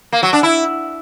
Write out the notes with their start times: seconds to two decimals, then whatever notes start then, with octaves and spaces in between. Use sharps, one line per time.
0.12 A#3
0.23 F#3
0.33 D4
0.43 E4